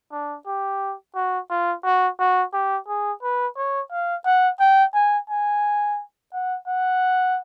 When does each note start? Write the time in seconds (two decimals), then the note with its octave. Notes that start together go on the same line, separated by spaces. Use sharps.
0.12 D4
0.47 G4
1.15 F#4
1.50 F4
1.84 F#4
2.19 F#4
2.53 G4
2.88 G#4
3.23 B4
3.57 C#5
3.92 F5
4.26 F#5
4.60 G5
4.94 G#5
5.30 G#5
6.33 F#5
6.67 F#5